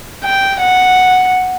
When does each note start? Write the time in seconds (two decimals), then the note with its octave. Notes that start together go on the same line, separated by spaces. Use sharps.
0.24 G5
0.62 F#5